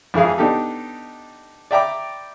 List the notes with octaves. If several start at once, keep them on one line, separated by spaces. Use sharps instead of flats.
F2 E3 G#3 E4 G#4 F5
B3 D4 D#4 G4 A4
D5 E5 G5 A#5 B5 D6